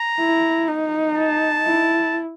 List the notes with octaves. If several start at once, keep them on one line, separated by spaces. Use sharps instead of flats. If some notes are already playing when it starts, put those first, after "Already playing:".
Already playing: A#5
E4
D#4
A5
E4